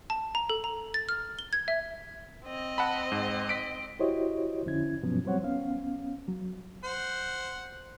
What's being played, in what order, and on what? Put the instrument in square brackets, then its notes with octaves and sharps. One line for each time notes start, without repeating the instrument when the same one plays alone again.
[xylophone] A5
A#5
A4
A#5
A6
F6
G7
G#6
E5
[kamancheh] C4 D#5
[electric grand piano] F#5 A5 B5
G#2
B6 D7
[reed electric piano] E4 F#4 G4 C5 C#5 D#5
F2 D3 C#4 E4 G#6
G2 B2 F3 F#3 B3 C#4
F#3 G3 C4 C5 C#5 F#5
B3 C#4 F5
F#3
[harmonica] C5 F#5